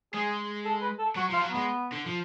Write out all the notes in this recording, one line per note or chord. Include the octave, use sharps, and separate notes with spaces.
G#3 G#4
A4
B4
A4
F#3 F#4
F3 F4
F#3
G#3 B3
D3
F3